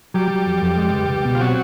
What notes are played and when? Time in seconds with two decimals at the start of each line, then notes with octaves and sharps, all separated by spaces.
0.14 F#3 G3 G4
0.30 F#3
0.46 F2
0.62 F2
0.78 G#3
0.93 C#2
1.09 C#2
1.25 B2
1.35 F4
1.40 F#3 C4 F#4